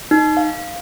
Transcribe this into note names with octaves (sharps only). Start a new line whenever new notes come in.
D#4
F5